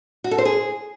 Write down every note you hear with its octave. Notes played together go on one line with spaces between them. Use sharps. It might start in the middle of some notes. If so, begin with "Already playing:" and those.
F#4
A4
C5
G#4